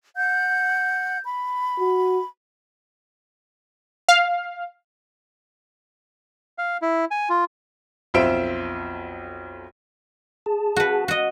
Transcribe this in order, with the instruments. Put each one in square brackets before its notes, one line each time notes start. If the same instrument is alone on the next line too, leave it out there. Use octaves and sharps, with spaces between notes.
[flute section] F#5 G6
B5
[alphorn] F#4
[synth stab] F5
[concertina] F5
E4
G#5
F4
[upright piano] B1 F2 F4 C5 E5 D7
[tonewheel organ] G#4 A5
[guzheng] F#4 B4
F#4 D#5